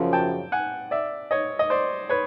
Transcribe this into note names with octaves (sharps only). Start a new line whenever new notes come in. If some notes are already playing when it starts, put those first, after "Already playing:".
Already playing: F#2 C#3 F3
G5 A5
F#5 G#5
D5 E5
C#5 D#5
D#5
C5 D5
B4 C#5